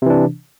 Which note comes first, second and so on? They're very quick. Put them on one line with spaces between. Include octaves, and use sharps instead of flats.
C3 E3 D4